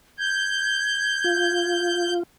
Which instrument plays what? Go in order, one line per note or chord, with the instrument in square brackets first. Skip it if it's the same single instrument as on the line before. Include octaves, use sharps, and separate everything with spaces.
[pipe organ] G6 [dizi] G#6
[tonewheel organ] F4